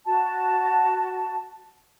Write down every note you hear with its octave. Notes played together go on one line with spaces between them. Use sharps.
F#4 A5